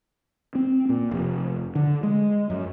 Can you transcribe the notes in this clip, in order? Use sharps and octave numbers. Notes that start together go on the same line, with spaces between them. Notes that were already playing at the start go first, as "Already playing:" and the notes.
C4
A#2
F1
D3
G#3
F#2